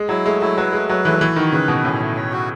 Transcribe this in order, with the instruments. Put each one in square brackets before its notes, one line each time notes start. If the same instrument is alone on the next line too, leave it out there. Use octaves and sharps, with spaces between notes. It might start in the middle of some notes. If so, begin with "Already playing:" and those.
Already playing: [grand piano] G#3
[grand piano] F#3 [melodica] E4
[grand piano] G#3 [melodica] A3
[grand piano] F#3 [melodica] E4
[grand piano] F#3 [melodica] B4
[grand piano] G#3 [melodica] A3
[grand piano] F#3 [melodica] B4
[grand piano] E3 [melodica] A3
[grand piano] F#3
[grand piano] E3 [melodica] F#4
[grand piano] D#3 [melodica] F#4
[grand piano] C#3 [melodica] B4
[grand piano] B2 [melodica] F#4
[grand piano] A2 [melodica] C#4
[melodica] A3
C#5
F#4